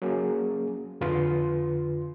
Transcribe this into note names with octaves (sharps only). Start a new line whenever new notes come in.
F#3 A#3 C#4 G#4
F2 D3 F4 B4 C6